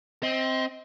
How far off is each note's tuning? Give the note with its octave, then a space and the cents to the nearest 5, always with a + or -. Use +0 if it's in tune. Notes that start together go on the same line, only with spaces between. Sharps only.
C4 +0 D#5 +30